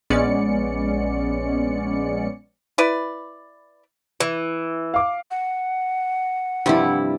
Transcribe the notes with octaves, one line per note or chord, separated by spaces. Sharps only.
A#1 G#3 B3 C#4 D5 C#7
E4 B4 D5
E3
F5 D6
F#5
G2 C3 F3 G3 E4